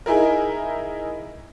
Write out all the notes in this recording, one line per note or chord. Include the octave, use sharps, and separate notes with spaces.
D#4 E4 G#4 A#4